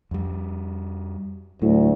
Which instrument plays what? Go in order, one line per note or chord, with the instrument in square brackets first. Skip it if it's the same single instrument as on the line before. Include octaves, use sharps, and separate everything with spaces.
[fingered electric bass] F2 G3
[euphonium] D2 [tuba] A2 [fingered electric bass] F#3